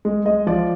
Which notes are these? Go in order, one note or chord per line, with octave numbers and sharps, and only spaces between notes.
G#3
G#3 D#5
F3 D5